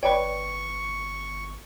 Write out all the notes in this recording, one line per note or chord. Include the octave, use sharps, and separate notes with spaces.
G1 B4 C#5 D5 G5 B5 C#6